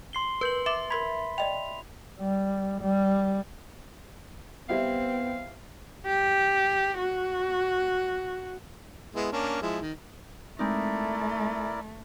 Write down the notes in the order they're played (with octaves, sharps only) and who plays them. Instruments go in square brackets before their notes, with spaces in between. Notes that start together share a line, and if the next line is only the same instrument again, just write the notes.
[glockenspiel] C6 C7 G7
[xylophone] A#4 G6 [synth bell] B4 F#7
[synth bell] E5 [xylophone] D6 E7
[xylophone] A#4 C6 G#6 [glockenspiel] B5 B6
[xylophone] D5 D#5 G5 [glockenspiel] F7
[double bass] G3
G3
[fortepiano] G3 E4 E5 [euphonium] B3 [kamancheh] C4 [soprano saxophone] F5
[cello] G4
F#4
[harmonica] G#3 B3 E4
A#3 C#4 D4
F3 G#3 E4
D#3
[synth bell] G#3 C4 D#4 [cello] A3 [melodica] E4 A#4 D5